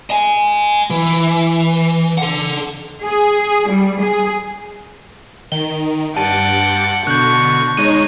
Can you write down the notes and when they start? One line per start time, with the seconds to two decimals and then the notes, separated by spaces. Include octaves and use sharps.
0.10 D#5 G#5
0.90 E3
2.18 A4 F#5
3.05 G#4
3.70 G3
4.02 G#4
5.52 D#3 G7
6.17 G2 F#5 G5 A5 D6 A6
7.07 B2 D3 C#6 F#6 G6
7.77 G#3 D#4 C#5 D#7